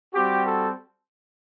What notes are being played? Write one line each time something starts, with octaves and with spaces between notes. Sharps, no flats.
G3 C4 F#4 G4
A4